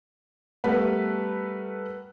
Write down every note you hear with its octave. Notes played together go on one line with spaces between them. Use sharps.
G3 A3 B3 A#4 B4